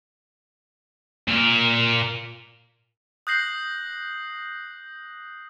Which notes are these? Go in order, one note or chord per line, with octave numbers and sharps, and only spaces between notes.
A#2 A#4
D#6 F#6 G6 A#6 C7 F#7